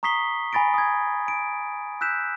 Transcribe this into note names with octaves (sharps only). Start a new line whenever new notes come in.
A#5 C#6 D#6 B6 C7 G7
G#5 B5 A6 A#6 D7
D#6 G#6
D7
E6 F#6 G6 B6 E7